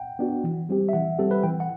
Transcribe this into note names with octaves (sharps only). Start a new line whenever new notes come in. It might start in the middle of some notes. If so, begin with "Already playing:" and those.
Already playing: F#5 G5
B3 D4 F#4
E3
G3 C4 G4
E5
E3 F#5
G3 C4 G4 A4
B4
E3 G5
F#5